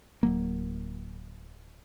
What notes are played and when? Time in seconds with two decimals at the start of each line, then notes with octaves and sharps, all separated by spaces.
0.23 D1 F#3 A#3